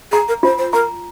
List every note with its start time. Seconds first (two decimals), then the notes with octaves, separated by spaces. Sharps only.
0.12 G#4 A#5
0.28 A#4
0.43 F4 C5
0.58 C5
0.73 A#4 A#5